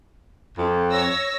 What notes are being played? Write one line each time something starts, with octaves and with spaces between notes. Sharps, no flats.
F2
C#5 E6 A#6